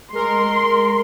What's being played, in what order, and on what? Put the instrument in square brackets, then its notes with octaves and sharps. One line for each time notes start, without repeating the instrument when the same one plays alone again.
[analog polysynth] G#3 A#4 [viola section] C6